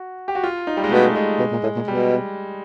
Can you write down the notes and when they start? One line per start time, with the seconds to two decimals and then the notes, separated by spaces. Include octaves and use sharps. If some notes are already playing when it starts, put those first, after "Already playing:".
Already playing: F#4
0.28 G4
0.35 F#4
0.44 F4
0.67 D#4
0.77 G3
0.84 G#3
0.91 B2 A3
1.16 G#3
1.39 B2
1.52 A#2
1.63 A2
1.76 A#2
1.88 B2 G3